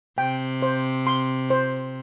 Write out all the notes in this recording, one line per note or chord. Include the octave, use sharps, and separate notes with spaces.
C3 G5
C5
C6
C5